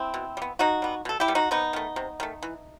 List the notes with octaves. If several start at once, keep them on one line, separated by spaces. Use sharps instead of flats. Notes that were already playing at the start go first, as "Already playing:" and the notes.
Already playing: C4 E4
B2
G3
B3
B2 D#4 F#4
G3 B3
B2 A4
E4 G4
G3 B3
D#4 F#4
C3 B3 D#4
D#3 A3
C3
D#3 A3
E3